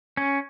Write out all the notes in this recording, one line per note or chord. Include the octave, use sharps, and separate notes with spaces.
C#4